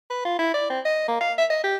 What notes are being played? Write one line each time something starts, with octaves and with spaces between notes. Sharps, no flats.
B4
F4
E4
D5
C4
D#5
A#3
F5
E5
D#5
G4